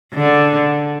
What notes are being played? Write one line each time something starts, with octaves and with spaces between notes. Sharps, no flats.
D3